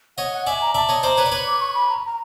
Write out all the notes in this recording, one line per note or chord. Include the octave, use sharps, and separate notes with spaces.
C#5 D#5 F#5
F#5
D5 E5 G#5
A#5
D5 E5 A5
C#5 D#5
C5 D5 A#5
B4 C#5
D5
B4 C#5
D6
C#6
B5
A#5
A#5